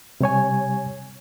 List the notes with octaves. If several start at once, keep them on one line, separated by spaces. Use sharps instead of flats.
C3 G3 C#5 G#5